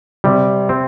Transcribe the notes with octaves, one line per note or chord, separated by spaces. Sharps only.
C3 G3
C4